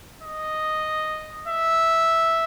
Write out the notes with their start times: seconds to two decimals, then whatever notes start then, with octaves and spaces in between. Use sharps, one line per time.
0.23 D#5
1.48 E5